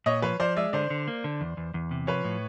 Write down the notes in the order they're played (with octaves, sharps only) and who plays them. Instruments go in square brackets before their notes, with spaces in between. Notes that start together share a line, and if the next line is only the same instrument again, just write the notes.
[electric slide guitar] A#2 [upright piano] C#5 D#5
[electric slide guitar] F3 [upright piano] B4 C#5
[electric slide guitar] F3 [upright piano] C5 D5
[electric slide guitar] G#3 [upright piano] D5 E5
[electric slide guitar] D3 [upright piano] C5 D5
[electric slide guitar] D3
A#3
D3
E2
E2
E2
C3
[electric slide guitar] F3 [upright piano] B4 C#5
[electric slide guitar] A2